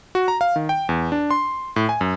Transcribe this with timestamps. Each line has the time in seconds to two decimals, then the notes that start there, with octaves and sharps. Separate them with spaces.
0.15 F#4
0.28 A#5
0.41 F5
0.56 D#3
0.69 G5
0.89 E2
1.12 D4
1.31 C6
1.76 A2
1.89 G#5
2.01 F#2